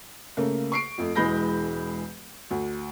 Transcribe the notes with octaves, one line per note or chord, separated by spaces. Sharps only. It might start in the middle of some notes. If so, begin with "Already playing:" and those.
C#3 A3 A#3
C#6 C7 D7
F2 A3
E1 E3 G#3 B5 G6 A#6
D2